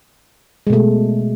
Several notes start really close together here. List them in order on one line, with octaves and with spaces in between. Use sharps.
G#3 B2 A3